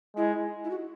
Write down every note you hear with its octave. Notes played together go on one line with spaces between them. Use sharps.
G#3 E4
E4
F#4